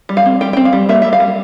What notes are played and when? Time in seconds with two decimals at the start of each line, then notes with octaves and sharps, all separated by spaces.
0.09 G3
0.17 F5
0.26 C4
0.41 G3 G5
0.53 C4 G5
0.65 F5
0.73 G3
0.89 A#3 E5
1.02 G3 E5
1.13 F5
1.20 G3